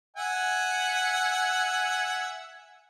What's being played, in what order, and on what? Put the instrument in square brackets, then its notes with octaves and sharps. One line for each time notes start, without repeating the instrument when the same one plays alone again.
[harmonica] E5 F#5 G#5